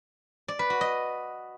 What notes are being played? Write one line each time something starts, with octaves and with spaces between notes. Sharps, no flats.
D5
B4
F#4
D#5